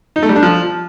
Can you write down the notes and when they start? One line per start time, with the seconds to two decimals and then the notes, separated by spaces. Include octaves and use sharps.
0.16 D#4
0.23 A3
0.29 G3
0.36 D4
0.43 F3